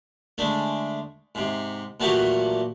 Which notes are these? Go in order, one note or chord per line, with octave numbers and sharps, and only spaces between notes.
D3 G#3 A3
G#2 C3
A#2 E3 F#3 A3 F#4 G4